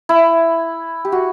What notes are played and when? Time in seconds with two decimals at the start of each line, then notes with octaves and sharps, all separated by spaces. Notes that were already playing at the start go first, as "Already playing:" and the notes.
0.09 E4
1.05 G4
1.12 F#4